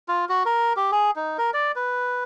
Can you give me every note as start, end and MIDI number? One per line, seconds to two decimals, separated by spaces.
0.08 0.25 65
0.29 0.43 66
0.46 0.73 70
0.77 0.91 67
0.92 1.11 68
1.16 1.37 63
1.38 1.51 70
1.54 1.72 74
1.76 2.24 71